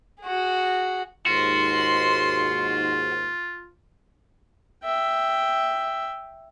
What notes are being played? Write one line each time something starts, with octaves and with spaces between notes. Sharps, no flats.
F#4 G#4
D#2 G#2 F4 F#4 C6
E5 G5